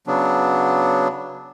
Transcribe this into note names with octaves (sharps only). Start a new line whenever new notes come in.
C#3 F#3 B3 D4